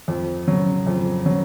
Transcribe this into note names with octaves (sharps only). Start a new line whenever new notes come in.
F2
C#3 F#3
F2
C#3 F#3